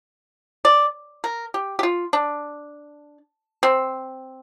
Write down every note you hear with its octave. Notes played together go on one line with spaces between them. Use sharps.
D5
A#4
G4
G4
F4
D4
C4